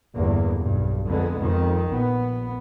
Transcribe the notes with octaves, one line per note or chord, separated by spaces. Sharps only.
G1 E2 G2 A#3
B1 G2
F2 D3 G#3 B3
F2 D#3
A#1 B3